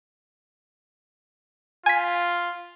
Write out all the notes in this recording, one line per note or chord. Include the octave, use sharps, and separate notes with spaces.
F4 G#5 B6